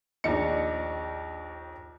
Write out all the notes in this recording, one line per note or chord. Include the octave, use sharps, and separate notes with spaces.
A#1 D#2 D4 D#4 C#7